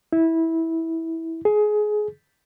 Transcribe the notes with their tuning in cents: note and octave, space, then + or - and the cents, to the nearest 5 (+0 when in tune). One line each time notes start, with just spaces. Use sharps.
E4 -15
G#4 +20